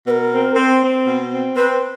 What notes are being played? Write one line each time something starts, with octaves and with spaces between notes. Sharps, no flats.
B2 A#4 B4
C4
C4
C4
B2
C4
C4 B4